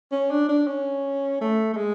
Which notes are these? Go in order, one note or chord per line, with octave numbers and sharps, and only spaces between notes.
C#4
D4
D4
C#4
A3
A3
G#3